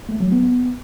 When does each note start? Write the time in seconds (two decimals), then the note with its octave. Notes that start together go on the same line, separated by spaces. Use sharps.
0.09 A3
0.20 F#3
0.32 B3